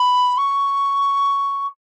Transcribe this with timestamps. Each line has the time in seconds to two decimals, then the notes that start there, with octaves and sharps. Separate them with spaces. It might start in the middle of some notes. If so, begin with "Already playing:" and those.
Already playing: B5
0.37 C#6